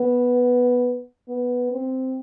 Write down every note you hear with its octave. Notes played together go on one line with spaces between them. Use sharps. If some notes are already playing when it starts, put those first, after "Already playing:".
Already playing: B3
B3
C4